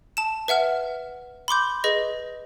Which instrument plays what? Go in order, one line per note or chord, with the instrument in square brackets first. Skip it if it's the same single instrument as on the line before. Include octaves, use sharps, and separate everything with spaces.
[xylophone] A5 E7
B4 E5 F#5 F6
B5 C6 D6 G6
G#4 B4 D#5 A#6